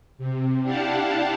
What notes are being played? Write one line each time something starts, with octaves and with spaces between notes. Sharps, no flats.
C3
D4 E4 G4 F5 F#5 A5